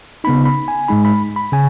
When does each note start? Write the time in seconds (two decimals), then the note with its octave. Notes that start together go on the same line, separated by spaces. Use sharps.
0.24 C#3 B3 D#4 B5
0.45 B5
0.68 G#5
0.88 G#2 G#3 D#4 B5
1.05 B5
1.36 B5
1.52 C#3 G#5